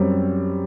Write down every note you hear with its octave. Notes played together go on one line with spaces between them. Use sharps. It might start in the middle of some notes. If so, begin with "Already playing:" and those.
Already playing: F#2 G3 C4